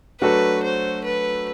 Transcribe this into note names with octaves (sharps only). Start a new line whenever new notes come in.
F#3 A3 D4 F#4 A4 B4
C5
B4